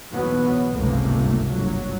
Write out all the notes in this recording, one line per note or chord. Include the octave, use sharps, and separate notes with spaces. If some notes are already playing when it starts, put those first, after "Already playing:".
B1 E2 B2 F#3 B3
G1 C#2 G#2 C3 A3 A#3
G1 F#3